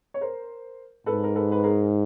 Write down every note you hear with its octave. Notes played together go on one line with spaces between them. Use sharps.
C#5
A#4 C5
G#2 A4 B4
A#4
A4 B4
B4
G#4 A#4